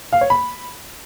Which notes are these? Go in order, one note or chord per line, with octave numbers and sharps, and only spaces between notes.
F5
C#5
B5